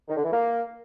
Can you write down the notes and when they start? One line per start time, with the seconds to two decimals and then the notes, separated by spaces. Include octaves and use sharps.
0.08 D#3
0.16 D3
0.24 E3
0.32 A#3